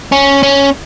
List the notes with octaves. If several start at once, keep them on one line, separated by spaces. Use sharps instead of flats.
C#4
C#4